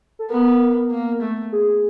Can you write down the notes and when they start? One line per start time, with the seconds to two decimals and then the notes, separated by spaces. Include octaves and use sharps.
0.19 A4
0.30 B3 A#4
0.91 A#3
1.22 A3
1.52 G#4